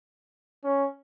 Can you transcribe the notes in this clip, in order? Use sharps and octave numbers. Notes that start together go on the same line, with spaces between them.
C#4